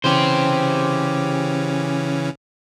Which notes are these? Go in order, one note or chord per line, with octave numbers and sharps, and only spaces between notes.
C#3 E3 C#4 G4 C5